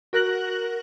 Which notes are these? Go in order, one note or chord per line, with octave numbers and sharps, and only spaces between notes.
F#4 A#4 F#6 A#6 F#7